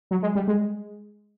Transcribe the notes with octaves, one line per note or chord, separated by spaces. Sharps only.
F#3
G#3
G3
G#3